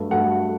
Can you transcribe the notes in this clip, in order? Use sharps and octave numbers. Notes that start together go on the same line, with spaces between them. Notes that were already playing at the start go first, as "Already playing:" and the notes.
Already playing: G2 F#3 A3
G2 F#3 A3 F#5